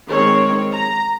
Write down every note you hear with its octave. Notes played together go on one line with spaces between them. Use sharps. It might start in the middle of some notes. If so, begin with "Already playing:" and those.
D#3 G#3 C4 C#5
A#5